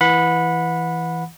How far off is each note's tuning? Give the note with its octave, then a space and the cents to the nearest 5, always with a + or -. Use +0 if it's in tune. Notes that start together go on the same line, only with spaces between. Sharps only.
E3 +0 F#5 -25 B5 +0